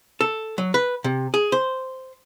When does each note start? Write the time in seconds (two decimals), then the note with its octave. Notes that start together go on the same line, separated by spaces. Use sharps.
0.21 A4
0.58 F#3
0.74 B4
1.04 C3
1.34 G#4
1.52 C5